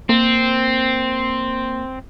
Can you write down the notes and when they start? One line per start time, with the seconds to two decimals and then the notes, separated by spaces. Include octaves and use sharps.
0.09 A#3 C4